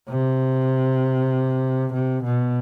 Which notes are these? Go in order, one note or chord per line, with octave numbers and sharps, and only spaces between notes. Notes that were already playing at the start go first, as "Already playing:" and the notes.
C3
C3
B2